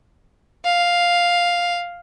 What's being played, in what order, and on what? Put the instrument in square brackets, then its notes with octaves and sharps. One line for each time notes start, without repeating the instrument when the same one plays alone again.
[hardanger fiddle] F5